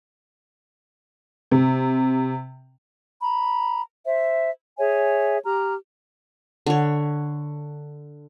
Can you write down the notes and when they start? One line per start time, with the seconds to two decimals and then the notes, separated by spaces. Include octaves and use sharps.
1.51 C3
3.21 A#5 B5
4.06 C5 E5
4.78 G#4 C#5 E5 G#5
5.44 G4 A#5 F6
6.66 D3 C#5